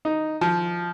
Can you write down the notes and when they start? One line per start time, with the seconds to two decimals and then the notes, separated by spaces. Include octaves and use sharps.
0.05 D#4
0.41 F3